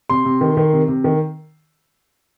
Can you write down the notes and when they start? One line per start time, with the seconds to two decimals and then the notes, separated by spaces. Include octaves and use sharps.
0.09 C3 C6
0.25 C3
0.41 D#3
0.57 D#3
0.73 C3
0.88 C3
1.04 D#3